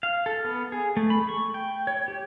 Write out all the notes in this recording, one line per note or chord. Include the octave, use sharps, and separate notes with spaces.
F5
A4
B3
G#4
A3
B5
C#6
G5
C#5
G4